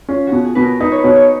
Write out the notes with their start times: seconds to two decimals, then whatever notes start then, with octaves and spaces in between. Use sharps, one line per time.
0.09 C#4 F4
0.27 F#4
0.32 B2
0.44 G#4
0.55 B2 B4
0.62 A#4
0.80 D#4 B4
0.92 C#5
0.98 B4
1.04 B2
1.16 C#5